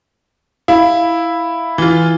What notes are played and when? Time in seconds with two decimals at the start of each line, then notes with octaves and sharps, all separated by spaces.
0.68 E4 F5
1.78 E3 F4